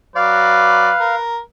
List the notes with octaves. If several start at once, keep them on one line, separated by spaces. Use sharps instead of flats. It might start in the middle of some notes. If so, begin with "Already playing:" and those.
F#3 B4 D5 F5
A#4